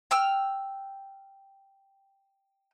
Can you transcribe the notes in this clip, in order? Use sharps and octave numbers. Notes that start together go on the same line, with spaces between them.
G5 E6 F6